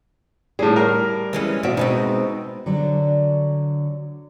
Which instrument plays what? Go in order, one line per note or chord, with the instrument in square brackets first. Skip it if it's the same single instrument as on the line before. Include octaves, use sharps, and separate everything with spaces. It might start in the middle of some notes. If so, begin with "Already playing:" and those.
[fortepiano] A2 G#4 [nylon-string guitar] G3
[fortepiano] A#4
[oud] E3 G#3 C#4
[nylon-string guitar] B2 E5 [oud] C4
[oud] B2 G#3 C4 [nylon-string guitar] D#4
[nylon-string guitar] D3 F#3 D4